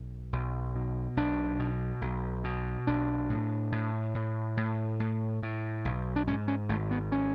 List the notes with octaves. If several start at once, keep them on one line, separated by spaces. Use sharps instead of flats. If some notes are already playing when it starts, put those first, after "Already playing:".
Already playing: B1
B1
B2
B1 D4
B2
B1
B2
B1 D4
A2
A2
A2
A2
A2
A2
B1
D4
G#2 C#4
C#4
G#1 A3
B3
C#4